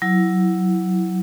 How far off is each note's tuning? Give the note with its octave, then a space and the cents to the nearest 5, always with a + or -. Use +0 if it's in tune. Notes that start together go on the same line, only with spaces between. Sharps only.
F#3 +0 E4 +0